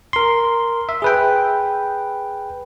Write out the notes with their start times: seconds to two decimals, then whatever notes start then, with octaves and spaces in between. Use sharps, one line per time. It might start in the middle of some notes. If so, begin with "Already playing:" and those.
0.13 A#4 C6
0.89 E5
1.02 G#4 B4 G5